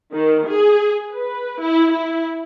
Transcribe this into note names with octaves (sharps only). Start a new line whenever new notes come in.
D#3
G#4
B4
E4
E4